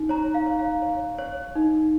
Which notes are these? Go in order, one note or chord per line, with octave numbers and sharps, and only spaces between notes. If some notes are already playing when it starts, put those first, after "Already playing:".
Already playing: D#4
C#5 A#5
F5
C#5
F5
C#5
C#5
D#4